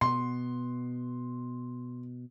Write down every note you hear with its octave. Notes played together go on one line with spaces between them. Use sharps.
B2 B3 C6